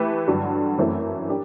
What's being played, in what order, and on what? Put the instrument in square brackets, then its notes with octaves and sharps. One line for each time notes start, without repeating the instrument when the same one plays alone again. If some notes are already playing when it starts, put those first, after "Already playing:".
Already playing: [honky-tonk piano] E3 A3 E4 G4 B4
G2 D3 F#3
F#2 E3 A3 C4 E4
D4 G4